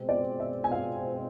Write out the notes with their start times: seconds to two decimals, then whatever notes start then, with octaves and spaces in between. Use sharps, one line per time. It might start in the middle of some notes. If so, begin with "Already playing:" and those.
Already playing: B2 G#3 C4
0.09 D5
0.40 E5
0.64 G#5
0.72 F5